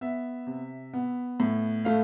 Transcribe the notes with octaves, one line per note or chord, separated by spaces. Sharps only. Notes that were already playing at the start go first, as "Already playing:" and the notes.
B3 E5
C3
B3
A2
A3 F5